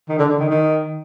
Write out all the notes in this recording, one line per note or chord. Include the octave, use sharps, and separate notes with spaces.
D#3
D3
D3
D#3
D#3